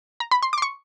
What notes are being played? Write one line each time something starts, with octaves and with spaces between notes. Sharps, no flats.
A#5
B5
C6
C6 D6
C#6